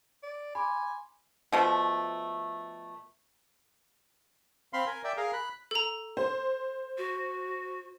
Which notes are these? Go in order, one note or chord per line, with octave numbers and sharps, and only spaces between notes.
D5
G#5 B5 C6 D6
B2 F3 A3
C4 F5 B5 C6
A#4 G#5
D5 E5 G5
G#4 A#4 F5
B5 F#6
A4 A#5
C5
F#4